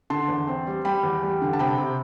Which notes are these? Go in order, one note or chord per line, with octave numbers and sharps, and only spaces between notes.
D3 A5 C6
E2
C4
G3
G3 G5 B5
E2
G3
D3
A5
C3 G5 B5
C3